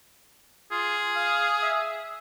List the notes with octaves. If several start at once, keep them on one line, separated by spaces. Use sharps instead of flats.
F4 G#4
F5
E5